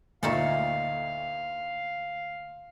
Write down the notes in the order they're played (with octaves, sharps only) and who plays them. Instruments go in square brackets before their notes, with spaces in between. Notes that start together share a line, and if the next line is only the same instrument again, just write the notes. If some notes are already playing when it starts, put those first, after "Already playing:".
[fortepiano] D2 A#2 [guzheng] A3 D#4 A4 [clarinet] F5